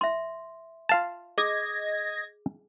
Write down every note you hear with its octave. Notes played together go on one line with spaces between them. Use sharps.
E5 C6
F4 F5 A5
G#4 D#5 G#6 A#6